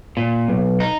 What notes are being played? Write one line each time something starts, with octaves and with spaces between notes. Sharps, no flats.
A#2
B1
D#4